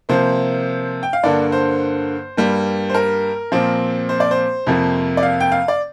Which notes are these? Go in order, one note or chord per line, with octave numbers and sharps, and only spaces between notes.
C3 F3 A#3 C5
G5
F5
G2 D3 A#3 D5
C5
G2 G3 A#3
C5
A#4
A#2 F3 C4
C5
D5
C5
F2 C3 F3 A#3
D5
F5
G5
F5
D5